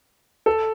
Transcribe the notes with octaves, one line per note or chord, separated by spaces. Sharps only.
A4